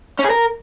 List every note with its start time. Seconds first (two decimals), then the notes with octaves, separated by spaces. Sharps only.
0.19 C#4
0.25 G#4
0.30 A#4